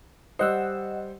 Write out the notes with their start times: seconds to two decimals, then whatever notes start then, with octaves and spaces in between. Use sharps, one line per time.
0.39 G3 C5 D#5 F#5 E6